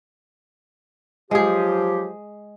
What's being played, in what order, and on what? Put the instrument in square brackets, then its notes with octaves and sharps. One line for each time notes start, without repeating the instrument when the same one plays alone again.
[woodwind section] F3 F#3 G4 [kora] G#3 G#4